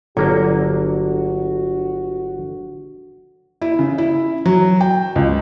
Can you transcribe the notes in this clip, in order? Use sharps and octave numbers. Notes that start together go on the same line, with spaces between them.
G1 D3 F#3 A#3 F#4
E4
C#3
E4
F#3
G5
C#2